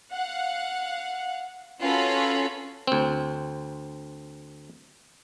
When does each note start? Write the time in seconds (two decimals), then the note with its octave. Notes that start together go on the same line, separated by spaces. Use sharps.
0.11 F5 F#5
1.81 C#4 F4 F#4 A4 B4 B5
2.87 D2 C4